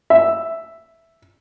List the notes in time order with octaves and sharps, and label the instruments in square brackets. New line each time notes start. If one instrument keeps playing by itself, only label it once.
[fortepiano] E5